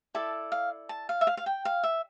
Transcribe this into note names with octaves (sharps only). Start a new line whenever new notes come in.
E4 A4 D5 A5
F5
A5
F5
E5
F5
F5
G5
F5
E5